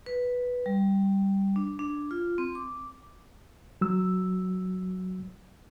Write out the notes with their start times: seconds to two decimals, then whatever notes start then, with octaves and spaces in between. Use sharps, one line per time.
0.06 B4
0.66 G3
1.56 D4
1.79 D4
2.11 F4
2.38 C4
2.55 D6
3.81 F#3 E6